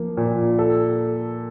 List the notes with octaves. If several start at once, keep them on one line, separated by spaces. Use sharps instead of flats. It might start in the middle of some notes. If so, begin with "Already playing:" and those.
Already playing: F3 A#3
A#2
A4